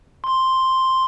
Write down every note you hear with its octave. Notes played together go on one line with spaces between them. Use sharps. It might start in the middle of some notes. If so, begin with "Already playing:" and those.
C6